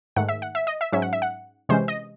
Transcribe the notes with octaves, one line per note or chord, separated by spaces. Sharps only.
G#2 D#3 A3 F#5
E5
F#5
E5
D#5
E5
G#2 F#3 C#4 E5
F#5
E5
F#5
C3 E3 G#3 C#4 C5
D#5